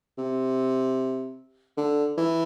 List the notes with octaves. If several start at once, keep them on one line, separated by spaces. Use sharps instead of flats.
C3
D3
E3